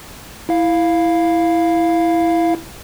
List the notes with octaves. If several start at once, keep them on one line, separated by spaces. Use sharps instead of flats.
E4 F5